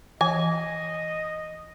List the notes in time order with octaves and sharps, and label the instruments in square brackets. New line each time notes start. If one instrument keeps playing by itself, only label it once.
[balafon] E3 [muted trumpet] D#5 [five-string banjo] G#5